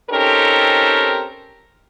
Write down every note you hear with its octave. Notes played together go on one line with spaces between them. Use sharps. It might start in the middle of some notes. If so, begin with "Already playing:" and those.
C4 C#4 D#4 G4 A4 A#4